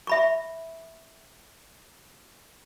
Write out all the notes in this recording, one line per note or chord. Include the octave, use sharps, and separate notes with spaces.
E5 B5 C#6